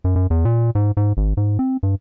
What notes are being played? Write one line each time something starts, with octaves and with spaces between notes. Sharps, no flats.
F#2
F#2
E2
A#2
G#2
G#2
G#1
G#2
C4
G2